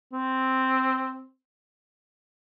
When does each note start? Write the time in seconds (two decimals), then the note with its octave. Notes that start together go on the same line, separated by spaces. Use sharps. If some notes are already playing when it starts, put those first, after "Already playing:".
0.13 C4